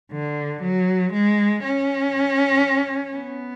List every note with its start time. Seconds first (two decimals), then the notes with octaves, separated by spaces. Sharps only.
0.12 D3
0.63 F#3
1.13 G#3
1.64 C#4
3.15 B3